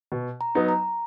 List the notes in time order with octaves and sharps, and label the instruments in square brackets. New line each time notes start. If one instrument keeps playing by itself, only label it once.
[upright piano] B2
[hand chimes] A#5
[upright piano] F#3 B3 D#4
[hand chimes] A#5